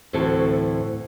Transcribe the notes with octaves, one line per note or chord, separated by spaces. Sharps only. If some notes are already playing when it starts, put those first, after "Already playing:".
D2 A2 E3 C4 F#4 A4